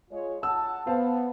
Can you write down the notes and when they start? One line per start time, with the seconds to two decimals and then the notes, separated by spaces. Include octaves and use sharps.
0.11 G#3 F4 C#5
0.43 F#5 A5 E6
0.87 B3 C5 F5 A5